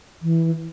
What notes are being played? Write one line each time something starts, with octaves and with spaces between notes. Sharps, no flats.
E3